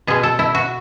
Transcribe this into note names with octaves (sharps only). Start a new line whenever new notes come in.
B2 G#3 G#4
A4
E4
F#4